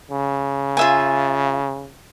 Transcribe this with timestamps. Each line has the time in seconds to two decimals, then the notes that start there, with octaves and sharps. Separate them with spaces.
0.11 C#3
0.77 F4 E5 G#5